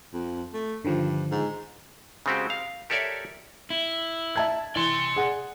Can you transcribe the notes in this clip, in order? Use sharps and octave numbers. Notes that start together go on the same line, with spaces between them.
F2
A3
G2 D3 D#3 F3
G#2
C#3 G#3 C4 F#4 G4
F5
G4 A4 A#4 C#5 D5 E5
E4
E5 A5 G#6
E3 D5 C6
G#4 F#5